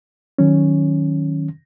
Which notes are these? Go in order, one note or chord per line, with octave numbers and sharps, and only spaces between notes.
D#3 F#3 C#4